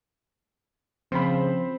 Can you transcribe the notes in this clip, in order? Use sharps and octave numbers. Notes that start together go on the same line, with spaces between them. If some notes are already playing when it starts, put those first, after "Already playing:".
C#3 F3 C4 C5 B5